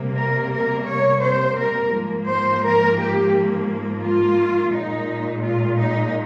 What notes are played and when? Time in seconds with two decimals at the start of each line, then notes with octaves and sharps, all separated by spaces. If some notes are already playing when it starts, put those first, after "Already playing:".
Already playing: C3 G3 A#3
0.16 A#4
0.51 A#4
0.86 C#5
1.21 C5
1.57 A#4
1.92 G#2 F3 A#3
2.26 C5
2.62 A#4
2.97 G4
4.02 F4
4.72 A#2 G#3 D#4
5.43 F4
5.77 D#4